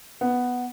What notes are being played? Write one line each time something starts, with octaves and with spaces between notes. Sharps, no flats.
B3